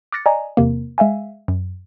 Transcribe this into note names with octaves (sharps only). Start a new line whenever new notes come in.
D6 F6 F#6 A6 A#6 C#7
D5 D#5 G#5 A#5
E2 C3 A#3
G#3 E5 F5 G#5
F#2